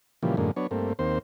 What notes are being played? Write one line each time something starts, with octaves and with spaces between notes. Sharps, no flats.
A#2 C#3 E3 F3 G3
F#2 A2 D3 G#3 A#3
F#3 B3 D4 C#5
G2 A3 A#3 C4
D#2 A#3 C4 C5